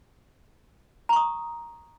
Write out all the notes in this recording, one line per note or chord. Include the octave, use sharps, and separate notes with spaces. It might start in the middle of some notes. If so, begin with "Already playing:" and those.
A#5 C#6 D#6